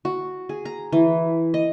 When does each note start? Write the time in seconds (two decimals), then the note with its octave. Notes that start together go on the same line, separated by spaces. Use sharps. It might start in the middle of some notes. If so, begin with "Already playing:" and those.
0.05 F#4
0.49 G#4
0.65 A#5
0.92 E3
1.54 D#5